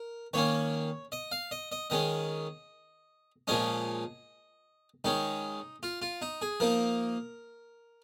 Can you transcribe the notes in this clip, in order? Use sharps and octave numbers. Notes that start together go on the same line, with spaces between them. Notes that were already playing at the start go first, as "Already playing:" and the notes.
Already playing: A#4
D#3 A#3 C#4 C#5
D#5
F5
D#5
D#5
D#3 G#3 C#4 D#5
A#2 F3 G#3 C#4 D#5
D#3 G#3 C#4 D#4
F4
F4
D#4
G#4
F3 A#3 D#4 A#4